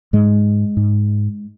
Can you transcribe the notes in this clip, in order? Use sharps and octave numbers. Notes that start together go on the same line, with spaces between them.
G#2 G#3
G#2